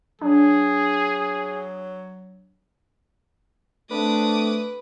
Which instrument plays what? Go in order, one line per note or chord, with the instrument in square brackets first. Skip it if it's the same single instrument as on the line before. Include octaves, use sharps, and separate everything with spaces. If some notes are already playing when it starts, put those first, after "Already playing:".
[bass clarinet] F#3 [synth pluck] D4 [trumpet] G#4
[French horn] A3 [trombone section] C4 D4 [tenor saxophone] B4 [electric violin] D6 D#6